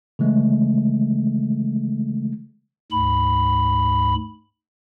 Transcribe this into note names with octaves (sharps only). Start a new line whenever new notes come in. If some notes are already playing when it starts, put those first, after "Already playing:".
C#3 E3 G#3 A3
D2 G#2 B5